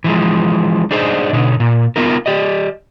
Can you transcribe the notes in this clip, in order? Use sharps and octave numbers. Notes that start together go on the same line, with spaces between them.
E3 F3 G#3
D4 D#4 G#4 C5 C#5 D#5
B2 D3 D#4
A#2
B3 D#4 F4 A#4
G4 D5 D#5